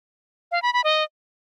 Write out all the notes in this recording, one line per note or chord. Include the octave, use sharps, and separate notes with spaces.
F5
B5
B5
D#5